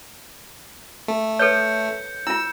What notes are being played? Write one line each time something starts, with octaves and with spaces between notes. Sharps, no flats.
A3
A4 B4 C#5 G6 C#7
E4 F4 E6